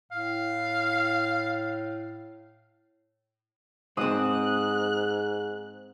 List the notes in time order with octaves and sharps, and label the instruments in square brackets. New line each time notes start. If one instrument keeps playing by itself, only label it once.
[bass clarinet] A2 [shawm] F5
[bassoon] G#2 [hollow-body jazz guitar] G#3 C4 [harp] D#6 D#7 [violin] F#6